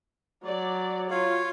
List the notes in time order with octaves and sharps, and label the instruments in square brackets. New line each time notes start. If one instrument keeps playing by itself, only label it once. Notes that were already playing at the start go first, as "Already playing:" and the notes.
[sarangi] F#3 [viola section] D5
[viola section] F4 [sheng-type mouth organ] C#5 F5